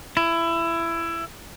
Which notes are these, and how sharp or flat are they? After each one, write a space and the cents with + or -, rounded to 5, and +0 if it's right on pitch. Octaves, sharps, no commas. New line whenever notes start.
E4 +20